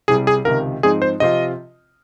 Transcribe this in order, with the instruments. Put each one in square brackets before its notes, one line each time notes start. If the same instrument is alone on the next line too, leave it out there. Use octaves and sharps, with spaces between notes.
[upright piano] C2 C3 G3 [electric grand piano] G#4
[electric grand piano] G#4
[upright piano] C#2 C3 D#3 [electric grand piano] A#4
[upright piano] G#2 F3 C4 D#4 [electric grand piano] G#4
[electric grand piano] C5
[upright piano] C3 F3 C4 F4 [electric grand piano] D#5